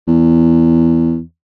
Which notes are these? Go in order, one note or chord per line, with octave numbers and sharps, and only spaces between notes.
E2